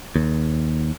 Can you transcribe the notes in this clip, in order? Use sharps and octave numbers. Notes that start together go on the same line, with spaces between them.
D#2